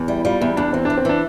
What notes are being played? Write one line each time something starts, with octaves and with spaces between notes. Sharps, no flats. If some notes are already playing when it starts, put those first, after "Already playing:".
Already playing: E2
G3 E4
G3 F4
E2 E4
E2 D4
E3 C4
D4
E3
C4
E3 D4